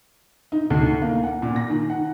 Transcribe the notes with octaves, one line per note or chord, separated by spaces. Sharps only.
D#4
D2
D#4
A#3
F#5
A#2
A#6
D#3
F#5